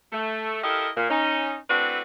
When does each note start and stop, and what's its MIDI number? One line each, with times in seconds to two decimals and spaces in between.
0.12 0.61 57
0.63 0.89 64
0.63 0.89 67
0.63 0.89 69
0.63 0.89 70
0.63 0.89 75
0.63 0.89 77
0.97 1.07 46
1.10 1.56 61
1.10 1.56 63
1.70 2.01 57
1.70 2.01 60
1.70 2.01 62
1.70 2.01 64
1.70 2.01 66
1.70 2.01 71